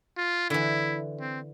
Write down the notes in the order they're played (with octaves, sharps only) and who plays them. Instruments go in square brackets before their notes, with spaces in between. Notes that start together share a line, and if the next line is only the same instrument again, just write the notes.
[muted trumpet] F4
[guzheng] D3 E3 [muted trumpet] E4
[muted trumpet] C4